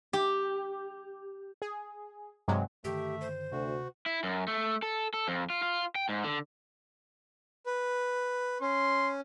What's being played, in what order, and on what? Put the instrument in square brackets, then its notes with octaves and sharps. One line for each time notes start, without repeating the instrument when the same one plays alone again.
[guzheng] G4
[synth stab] G#4
G2 C3 F#3 G#3
[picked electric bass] G2 D3 D#3 [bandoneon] A3 E5 [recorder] G4
[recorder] C5
[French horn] D2 [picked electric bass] C3 [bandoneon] F#4
[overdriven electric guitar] E4
F#2
A3
A4
A4
F2
F4
F4
G5
G#2
D3
[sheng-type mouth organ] B4
[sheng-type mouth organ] C#4 [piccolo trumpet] C6